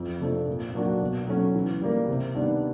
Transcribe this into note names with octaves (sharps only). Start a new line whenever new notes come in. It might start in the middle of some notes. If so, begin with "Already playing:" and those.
Already playing: F2
C3 F3 A3 D4
A#2
F#3 A#3 D4 F#4
B2
F#3 A3 C#4
E3
G3 A#3
C3
D#3 G3 B3 D4